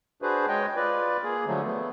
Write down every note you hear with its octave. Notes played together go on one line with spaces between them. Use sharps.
D4 F#4 G#4 B4 C5
G#3 C#5 D#5 G5
F4 B4 D5
A#3 G#4
D3 F3 F#3 A3
A3 B3